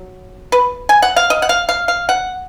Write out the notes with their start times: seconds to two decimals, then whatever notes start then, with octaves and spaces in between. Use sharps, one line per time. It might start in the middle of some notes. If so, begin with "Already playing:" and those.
Already playing: F#3
0.52 B4
0.89 G#5
1.02 F#5
1.16 F5
1.30 D#5
1.42 F#5
1.49 F5
1.69 F5
1.88 F5
2.09 F#5